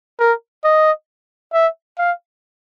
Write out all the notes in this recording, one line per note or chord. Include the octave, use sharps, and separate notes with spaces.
A#4
D#5
E5
F5